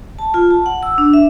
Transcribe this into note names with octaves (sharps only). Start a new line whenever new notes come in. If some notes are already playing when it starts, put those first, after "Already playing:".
A5
F4
A5
F#5
E6
D4
E5